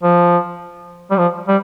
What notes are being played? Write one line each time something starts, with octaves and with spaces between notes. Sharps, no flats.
F3
G3
F3
G3